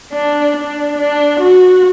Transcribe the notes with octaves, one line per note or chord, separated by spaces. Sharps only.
D4
D4
D4
F#4